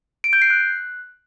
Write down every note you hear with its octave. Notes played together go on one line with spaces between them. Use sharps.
D7
G6
C7
F#6